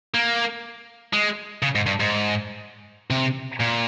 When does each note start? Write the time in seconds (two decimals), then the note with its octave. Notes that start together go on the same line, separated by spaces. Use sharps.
0.14 A#3
1.13 G#3
1.63 C#3
1.75 G#2
1.86 G2
2.00 G#2
3.10 C3
3.60 A#2